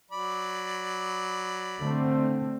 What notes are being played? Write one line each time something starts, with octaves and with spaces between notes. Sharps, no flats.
F#3 D5 B5
D3 A3 C4